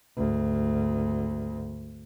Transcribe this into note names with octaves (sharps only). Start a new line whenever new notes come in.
G#1 D2